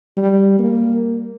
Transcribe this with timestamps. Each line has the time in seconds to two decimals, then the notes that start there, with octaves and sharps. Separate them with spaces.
0.17 G3
0.59 A#3